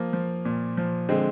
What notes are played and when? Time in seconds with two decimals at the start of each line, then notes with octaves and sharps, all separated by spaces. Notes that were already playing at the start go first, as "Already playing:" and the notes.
Already playing: F3 A#3
0.13 F3
0.45 A#2
0.77 F3
1.09 D3 G#3 C4